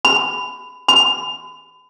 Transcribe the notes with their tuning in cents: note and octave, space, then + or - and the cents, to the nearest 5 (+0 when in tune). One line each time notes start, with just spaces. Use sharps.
B5 +20
B5 +35